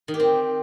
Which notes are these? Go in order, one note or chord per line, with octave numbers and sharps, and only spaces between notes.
D#3
G4
C4